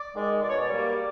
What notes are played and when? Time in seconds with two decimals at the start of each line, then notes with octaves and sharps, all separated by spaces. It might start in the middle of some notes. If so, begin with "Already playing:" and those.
Already playing: D5
0.15 D#3 G#3
0.43 B2 D5
0.50 C#5
0.57 D5
0.69 G3 A#3